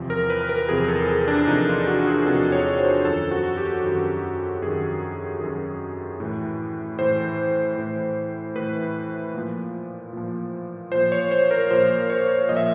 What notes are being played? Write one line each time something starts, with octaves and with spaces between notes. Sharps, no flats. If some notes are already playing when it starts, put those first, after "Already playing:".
Already playing: E2 C3 F3
A#4
B4
A#4
E2 C3 F3 G#4
A4
G#4
D4
E2 C3 F3 D#4
F4
F#4
G#4
E2 C3 F3 A4
C#5
C5
F#2 D#3 A4
F#4
G4
F#2 D#3
F#2 D#3 G#4
F#2 D#3
A2 E3
A2 E3 C5
A2 E3
A2 E3 B4
A#2 F3
A#2 F3
A#2 F3 C5
C#5
C5
A#4
A#2 F3 C5
C#5
A#2 F3 D#5
E5